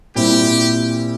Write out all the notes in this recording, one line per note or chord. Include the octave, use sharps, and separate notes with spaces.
A#2 G3 C4 E4 G4